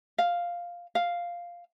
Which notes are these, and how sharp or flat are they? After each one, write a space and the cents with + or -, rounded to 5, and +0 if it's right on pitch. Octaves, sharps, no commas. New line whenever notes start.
F5 +0
F5 +0